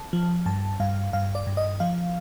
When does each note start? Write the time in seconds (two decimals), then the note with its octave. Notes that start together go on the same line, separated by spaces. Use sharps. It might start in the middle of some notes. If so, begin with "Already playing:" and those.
Already playing: A5
0.13 F3
0.46 G2 A5
0.80 G2 F5
1.13 G2 F5
1.35 D5
1.47 G2
1.57 D#5
1.80 F3 F5